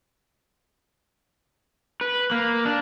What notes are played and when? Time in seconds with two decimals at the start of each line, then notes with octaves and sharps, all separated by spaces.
2.01 B4
2.31 A#3
2.65 D4